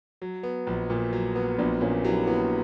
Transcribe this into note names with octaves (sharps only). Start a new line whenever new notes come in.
F#3
B3
A#1
A#2
F#3
B3
A#1 B3 D4
A#2 A#3 C#4
F#3 E4 G4
B3 E4 G4